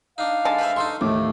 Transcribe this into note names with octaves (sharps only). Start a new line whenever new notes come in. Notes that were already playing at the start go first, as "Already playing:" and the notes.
D4 D#4 F5
D3 G#3 A5
B4 C5 E5
D#4 A4 C6 C#6
D#2 A2 A3 D6